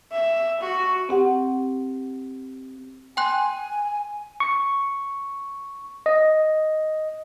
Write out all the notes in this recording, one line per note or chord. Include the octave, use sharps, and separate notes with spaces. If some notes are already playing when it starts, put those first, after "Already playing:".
E5
F#4
C4 G4 F#5
G5 G#5 C6 F#6
C#6
D#5